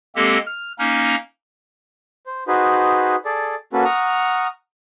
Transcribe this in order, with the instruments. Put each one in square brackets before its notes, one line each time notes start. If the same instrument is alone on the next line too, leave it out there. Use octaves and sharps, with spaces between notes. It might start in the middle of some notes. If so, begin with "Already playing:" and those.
[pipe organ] G#3 A#3 C4 G4 A4
F6
A#3 C#4 D#4 F6
[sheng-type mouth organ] C5
D#4 F#4 G#4 B4 C5
G#4 A4 D5
A#3 C#4 F#4 A4 B4
F#5 A#5 C#6 D#6 F6